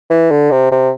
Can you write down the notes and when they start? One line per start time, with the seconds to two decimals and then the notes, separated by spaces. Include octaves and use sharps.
0.10 E3
0.31 D3
0.51 C3
0.71 C3